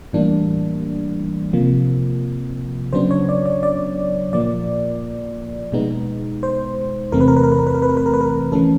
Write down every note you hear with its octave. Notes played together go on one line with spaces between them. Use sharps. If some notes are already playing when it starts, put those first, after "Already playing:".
A2 E3 G3 A#3 D4
C3 F3 A#3
C#3 F#3 B3 D4 C5
C#5
D5
D5
D5
A#2 F3 A#3 D5
B2 G#3 B3 D#4
C5
E2 C3 E3 A3 C4 A#4
B4
A#4
B4
A#4
B4
A#4
B4
A#4
B4
A#4
B4
A#4
B4
A#4
E3 A3 C#4 A4